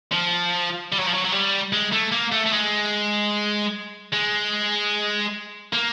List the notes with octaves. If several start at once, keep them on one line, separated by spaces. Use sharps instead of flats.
F3
G3
F#3
F3
F#3
F#3
G3
G#3
A3
A#3
A3
A3
G#3
G#3
A#3